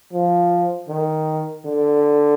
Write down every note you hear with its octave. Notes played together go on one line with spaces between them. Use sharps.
F3
D#3
D3